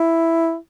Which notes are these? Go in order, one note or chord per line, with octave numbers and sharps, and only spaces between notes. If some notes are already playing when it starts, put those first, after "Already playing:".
Already playing: E4